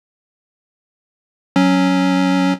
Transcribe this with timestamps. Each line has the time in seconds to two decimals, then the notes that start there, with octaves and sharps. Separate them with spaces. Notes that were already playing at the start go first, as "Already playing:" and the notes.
1.56 F#3 C#4